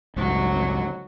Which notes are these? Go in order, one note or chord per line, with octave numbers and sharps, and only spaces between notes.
G1 C#2 A2 F#3